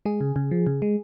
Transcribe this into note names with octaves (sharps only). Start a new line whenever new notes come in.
G#3 G#4
C#3
C#3
F3
C#3
G#3